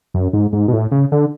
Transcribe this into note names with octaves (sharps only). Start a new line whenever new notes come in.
F#2
G#2
G#2
B2
A2
C#3
D3